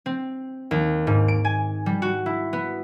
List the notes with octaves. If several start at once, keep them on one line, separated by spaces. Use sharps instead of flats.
C4
D#2
G#2
D7
G#5
G3
F#4
E4
B3